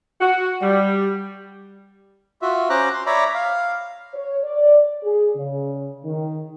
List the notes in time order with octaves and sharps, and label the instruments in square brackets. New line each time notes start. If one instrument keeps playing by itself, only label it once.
[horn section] F#4
G3
[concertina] F4 F#4 E5
C#4 C5 A#5 D6 F#6
C6
C#5 D5 E5 A#5 B5 D6
F5
[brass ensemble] C#5
D5
G#4
C#3
D#3